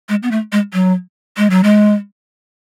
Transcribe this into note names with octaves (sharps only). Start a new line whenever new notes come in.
G#3
B3
A3
G#3
F#3
G#3
F#3
G#3